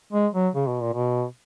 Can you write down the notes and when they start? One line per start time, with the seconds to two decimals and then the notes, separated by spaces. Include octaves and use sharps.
0.13 G#3
0.34 F#3
0.55 C#3
0.67 B2
0.81 A#2
0.93 B2